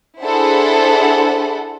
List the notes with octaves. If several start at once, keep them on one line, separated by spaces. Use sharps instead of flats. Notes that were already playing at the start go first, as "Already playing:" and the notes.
D4 E4 G#4 A4 C5 F#5